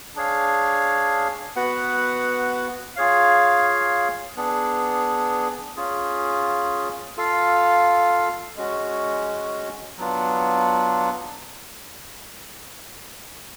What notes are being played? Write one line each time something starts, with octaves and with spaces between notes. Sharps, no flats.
D4 G#4 C#5 F5
B3 F#4 B4 F#5
F4 G#4 C#5 F5
B3 D4 G#4
C#4 F4 G#4
F4 A4 F5
G#3 C#4 F#4
F#3 B3 D4 F4